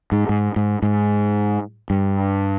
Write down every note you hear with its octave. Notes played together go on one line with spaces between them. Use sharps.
G#2
G#2
G#2
G#2
G2